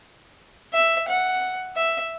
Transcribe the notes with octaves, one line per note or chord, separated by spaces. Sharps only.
E5
F#5
E5